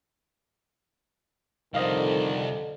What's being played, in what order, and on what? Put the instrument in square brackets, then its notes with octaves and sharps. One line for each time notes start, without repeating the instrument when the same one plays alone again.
[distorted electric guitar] C2 G3 [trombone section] F2 D3 [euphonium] D#3 [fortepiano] C5 D#5 F5